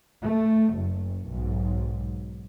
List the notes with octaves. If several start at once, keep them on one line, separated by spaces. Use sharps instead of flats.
A3
F#1
B1 G#2